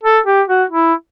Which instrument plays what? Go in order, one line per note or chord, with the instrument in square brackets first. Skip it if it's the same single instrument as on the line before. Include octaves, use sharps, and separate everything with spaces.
[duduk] A4
G4
F#4
E4